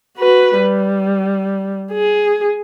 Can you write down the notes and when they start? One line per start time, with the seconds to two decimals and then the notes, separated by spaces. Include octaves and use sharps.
0.17 F#4 B4
0.57 G3
1.92 G#4